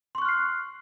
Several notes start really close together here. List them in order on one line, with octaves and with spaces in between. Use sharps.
C6 C#6 F#6 F6 C7